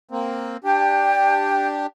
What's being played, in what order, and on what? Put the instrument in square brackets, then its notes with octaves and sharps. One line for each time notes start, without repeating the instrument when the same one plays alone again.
[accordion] A#3 C4
[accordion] D4 G4 [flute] G5